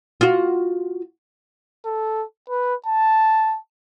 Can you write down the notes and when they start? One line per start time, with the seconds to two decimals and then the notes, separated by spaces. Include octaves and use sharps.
0.21 F4 F#4
1.85 A4
2.50 B4
2.86 A5